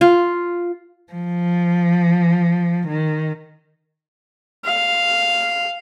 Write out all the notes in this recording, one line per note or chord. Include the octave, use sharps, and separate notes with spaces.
F4
F3
D#3
F5